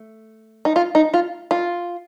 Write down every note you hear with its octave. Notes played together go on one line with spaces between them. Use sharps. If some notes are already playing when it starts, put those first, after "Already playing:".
Already playing: A3
D#4
F4
D#4
F4
F4